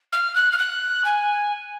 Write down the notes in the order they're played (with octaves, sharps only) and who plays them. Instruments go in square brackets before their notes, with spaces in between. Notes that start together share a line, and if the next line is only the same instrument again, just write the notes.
[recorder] F6
F#6
F6
F#6
G#5